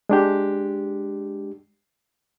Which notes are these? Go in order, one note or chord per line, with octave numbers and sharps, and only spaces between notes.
G#3 D4 G4